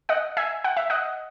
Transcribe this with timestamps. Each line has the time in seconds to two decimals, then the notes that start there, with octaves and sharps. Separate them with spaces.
0.09 D#5 F#5
0.37 E5 G#5
0.64 F#5
0.77 E5
0.90 D#5 F#5